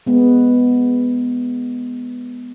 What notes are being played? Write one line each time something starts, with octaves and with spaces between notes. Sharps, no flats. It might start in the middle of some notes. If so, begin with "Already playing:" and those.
G#3 B3